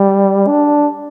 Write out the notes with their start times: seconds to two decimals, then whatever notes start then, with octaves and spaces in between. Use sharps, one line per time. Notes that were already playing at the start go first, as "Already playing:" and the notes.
Already playing: G3
0.47 D4